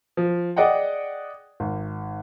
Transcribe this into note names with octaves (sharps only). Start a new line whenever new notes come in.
F3
G#4 D5 D#5 F#5 G5
G#1